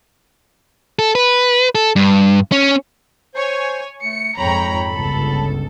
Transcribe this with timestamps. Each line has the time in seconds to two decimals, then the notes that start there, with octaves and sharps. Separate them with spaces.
0.99 A4
1.15 B4
1.75 A4
1.96 G2
2.52 C#4
3.34 C5 C#5 G#5
4.02 A3 C#7
4.37 F2 G#2 C#5 G5 A#5 B5
4.90 G1 C#2 A4